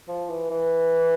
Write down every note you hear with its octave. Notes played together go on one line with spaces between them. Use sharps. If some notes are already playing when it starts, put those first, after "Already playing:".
F3
E3
E3